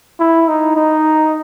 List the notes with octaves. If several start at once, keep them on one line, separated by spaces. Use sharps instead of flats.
E4
D#4
D#4